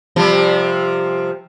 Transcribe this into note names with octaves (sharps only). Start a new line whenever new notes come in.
C3 F3 G3